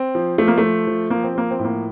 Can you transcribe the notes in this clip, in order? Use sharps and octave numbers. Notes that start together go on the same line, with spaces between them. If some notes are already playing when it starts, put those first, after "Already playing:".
Already playing: C4
F3
F3 A3
A#3
F3 A3
F3
F3 A#3
C4
F3 A#3
C4
A2
A#3